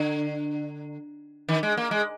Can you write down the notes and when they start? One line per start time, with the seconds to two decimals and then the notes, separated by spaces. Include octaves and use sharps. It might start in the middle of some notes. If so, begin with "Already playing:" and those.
Already playing: D3
1.49 D#3
1.63 G#3
1.77 A#3
1.91 G#3